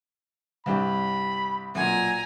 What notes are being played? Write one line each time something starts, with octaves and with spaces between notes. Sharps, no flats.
C2 G2 G4 B5
B1 A#2 G#5 A#5